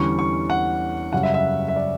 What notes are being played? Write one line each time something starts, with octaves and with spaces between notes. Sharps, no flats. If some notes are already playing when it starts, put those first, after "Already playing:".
Already playing: E2 D3 G3 C#4 C#6
C#6
F#5
F#2 C#3 G3 C#4 F#5
E5
E5
E5
D5